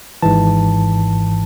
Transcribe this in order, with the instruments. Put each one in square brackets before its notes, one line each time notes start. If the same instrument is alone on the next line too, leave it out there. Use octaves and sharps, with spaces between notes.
[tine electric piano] G#1 G#2 E3 A5